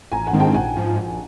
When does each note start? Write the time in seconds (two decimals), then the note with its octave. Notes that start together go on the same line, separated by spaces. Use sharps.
0.12 A1 G#5 A#5
0.27 F#5 G#5
0.33 G#2 D#3 G#3 C4
0.40 G5 A5
0.54 A#1 F#5 G#5
0.77 G#2 F3
0.97 A#1